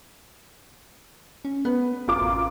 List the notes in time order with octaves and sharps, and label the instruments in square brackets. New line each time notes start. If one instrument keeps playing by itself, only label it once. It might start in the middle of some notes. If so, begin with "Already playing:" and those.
[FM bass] C#4
[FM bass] B3 [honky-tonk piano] B4
[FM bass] G1 [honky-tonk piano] F#2 F4 D6
[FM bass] A1